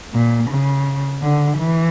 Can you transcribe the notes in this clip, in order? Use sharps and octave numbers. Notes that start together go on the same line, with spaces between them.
A#2
C#3
D3
E3